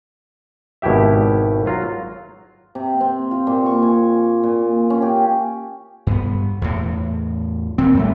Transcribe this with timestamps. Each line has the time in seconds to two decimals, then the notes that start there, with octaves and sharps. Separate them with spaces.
0.82 G#1 B2 E4 G4 E5
1.66 F#3 F4 F5 A#5
2.75 C3
3.01 C4
3.31 F4
3.47 A#2
3.66 C#6
3.82 G#5
4.43 A#2
4.90 C#4
5.02 G4
6.07 G2 B3
6.62 E2 A2
7.78 A#2 D#3 C4
7.95 F#2 G3 A3